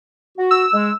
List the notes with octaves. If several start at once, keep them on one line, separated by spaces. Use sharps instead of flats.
F#4
E6
G#3